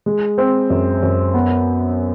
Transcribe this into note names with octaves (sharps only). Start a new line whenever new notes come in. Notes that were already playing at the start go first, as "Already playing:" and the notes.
G#3
C4
F#2
F#2
B3